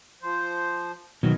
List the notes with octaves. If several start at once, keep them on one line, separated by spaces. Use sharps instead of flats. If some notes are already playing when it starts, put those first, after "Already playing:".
F3 C5
B2 D#3 F#3